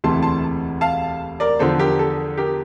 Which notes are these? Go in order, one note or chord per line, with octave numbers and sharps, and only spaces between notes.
E1 D2 C3 E3 A5 C6
A5 C6
F5 A5
A#4 D5
E2 D3 F3 A4 C5
G4 A#4
A4
G4 A#4